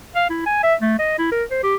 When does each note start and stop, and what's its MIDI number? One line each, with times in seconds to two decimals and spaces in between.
0.15 0.27 77
0.30 0.45 64
0.46 0.62 80
0.63 0.74 76
0.81 0.98 57
0.99 1.17 75
1.18 1.28 64
1.31 1.43 70
1.51 1.60 72
1.63 1.75 67